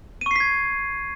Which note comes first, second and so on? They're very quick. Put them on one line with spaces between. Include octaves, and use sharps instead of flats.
D#7 C#6 C7 B6 G#6